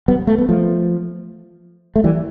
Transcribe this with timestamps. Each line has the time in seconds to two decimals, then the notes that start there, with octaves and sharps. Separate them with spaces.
0.08 G3 B3
0.27 A3
0.38 B3
0.49 F3 A3
1.96 A3
2.04 E3 G3